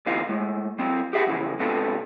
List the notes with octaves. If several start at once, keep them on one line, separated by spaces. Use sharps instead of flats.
D2 C3 E3 D#4 F4 F5
A2 G#3
F#3 C4 C5
G4 G#4 E5 F#5
F2 C#3 E3
G#2 C3 B3 D4 F4 A4